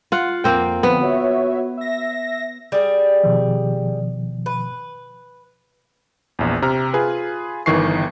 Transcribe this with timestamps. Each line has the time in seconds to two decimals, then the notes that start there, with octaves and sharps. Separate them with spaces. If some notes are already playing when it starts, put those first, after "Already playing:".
0.12 F4 F#5
0.44 F2 A#3 C4 G5
0.83 D3 F3 B3 C4
1.01 F#4 C#5 E5
1.77 E5 A#6
2.72 G3 G#4
3.23 B2 D#3 F3
4.46 B4
6.39 A#1 E2
6.62 C3 A#5 F6
6.93 F4 G#4 B4
7.66 G1 D#3 E3 C#6 C7